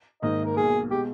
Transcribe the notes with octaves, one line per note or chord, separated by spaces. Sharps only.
G#1 G#2 D#3 A#3 D#4 D#5
A#4
B1 B2 A#3 G#4
B2 G#3 G4